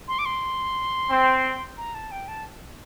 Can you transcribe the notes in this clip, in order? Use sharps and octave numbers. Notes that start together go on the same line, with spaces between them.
C6
D6
C6
C4
A#5
A5
G5
A5